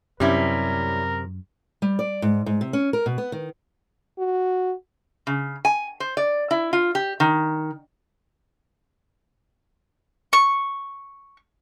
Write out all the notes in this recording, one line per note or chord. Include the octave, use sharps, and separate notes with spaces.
F#2 C3 G3 C#4 E4 A#4
G3
D5
G#2
G#2
C3
C#4
A#4
B2
B3
D#3
F#4
C#3
G#5
C5
D5
E4
F4
G4
D#3
C#6